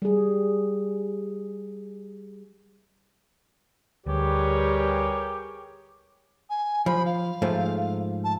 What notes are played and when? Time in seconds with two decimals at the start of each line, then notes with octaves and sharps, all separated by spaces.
0.02 G3 G#4
4.06 D2 G3 G4 G#4 A#4 B4 C#5
6.50 G#5
6.86 F3 B5
7.06 F5
7.42 G#2 F3 A3
8.24 A5